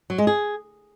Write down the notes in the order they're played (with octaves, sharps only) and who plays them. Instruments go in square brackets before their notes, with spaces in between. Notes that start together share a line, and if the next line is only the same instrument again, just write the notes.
[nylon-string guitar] F#3
G#3
G#4